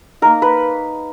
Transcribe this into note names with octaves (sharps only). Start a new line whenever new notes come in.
A#3 D#4 A#4
B4